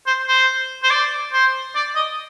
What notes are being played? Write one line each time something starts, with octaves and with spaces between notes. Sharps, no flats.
C5
C5
C5
D5
C5
D5
D#5